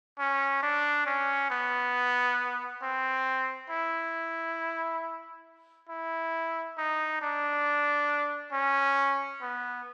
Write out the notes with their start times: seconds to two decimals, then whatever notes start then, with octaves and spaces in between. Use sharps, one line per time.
0.19 C#4
0.63 D4
1.06 C#4
1.50 B3
2.83 C4
3.70 E4
5.89 E4
6.78 D#4
7.22 D4
8.53 C#4
9.42 B3